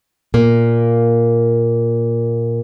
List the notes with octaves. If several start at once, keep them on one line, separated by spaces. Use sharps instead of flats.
A#2 A#3